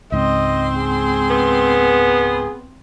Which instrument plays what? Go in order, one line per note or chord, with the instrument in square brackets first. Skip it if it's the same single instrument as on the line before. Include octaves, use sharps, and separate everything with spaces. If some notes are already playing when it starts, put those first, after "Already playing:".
[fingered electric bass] C#2 G#2 [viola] C4 C6 [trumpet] D#5
[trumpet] G#4
[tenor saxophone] B3